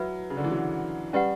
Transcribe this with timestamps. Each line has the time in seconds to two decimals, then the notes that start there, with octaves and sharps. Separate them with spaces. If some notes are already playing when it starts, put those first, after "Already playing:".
Already playing: F#3 E4 B4 E5 B5
0.30 C#3
0.37 D3
0.44 E3
0.51 F#3
1.13 G3 C#4 G4 B4 F#5